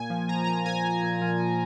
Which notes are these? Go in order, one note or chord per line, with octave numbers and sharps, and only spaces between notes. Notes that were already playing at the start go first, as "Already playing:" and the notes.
Already playing: A#2 G#5
F3
F3 A#5
F3 A#5
A#2 G#5
A#2
A#2
F3
F3